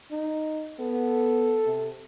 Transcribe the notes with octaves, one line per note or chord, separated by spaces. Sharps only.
D#4
B3 A4
C3